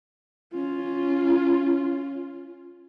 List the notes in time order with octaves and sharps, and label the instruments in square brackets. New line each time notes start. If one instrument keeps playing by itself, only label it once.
[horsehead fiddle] C#4 F4